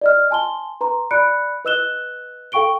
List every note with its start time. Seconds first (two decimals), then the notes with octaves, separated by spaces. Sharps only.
0.01 D5 D#5 F6
0.31 G#5 A5 C6 G7
0.81 B4 A#5 C6
1.11 D5 B5 F#6 C#7 D7
1.65 B4 D#5 E6 F#6 E7 G7
2.52 A4 F5 G5 C#6 D7 G7